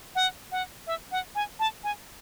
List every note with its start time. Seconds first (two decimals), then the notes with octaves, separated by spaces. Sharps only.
0.15 F#5
0.52 F#5
0.87 E5
1.12 F#5
1.35 G#5
1.59 A5
1.84 G#5